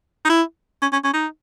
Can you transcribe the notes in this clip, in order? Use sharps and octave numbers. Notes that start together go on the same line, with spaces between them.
D#4
E4
C#4
C#4
C#4
D#4